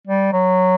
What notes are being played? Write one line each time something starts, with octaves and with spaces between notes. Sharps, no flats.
G3
F#3